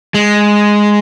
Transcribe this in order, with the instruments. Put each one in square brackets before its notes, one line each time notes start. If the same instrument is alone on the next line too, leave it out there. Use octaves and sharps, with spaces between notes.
[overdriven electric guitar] G#3